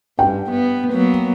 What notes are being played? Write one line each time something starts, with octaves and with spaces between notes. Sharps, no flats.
G2 G5
B3
F#3 A#3 B3